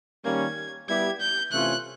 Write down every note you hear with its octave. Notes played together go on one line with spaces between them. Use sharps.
D#3 G3 A#3 C#4 G#6
G3 B3 E4 G4 G#6
G6
C3 E3 A3 C#4 F4 F#6